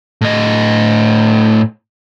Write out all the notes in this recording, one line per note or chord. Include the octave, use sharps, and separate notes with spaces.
A2 D#5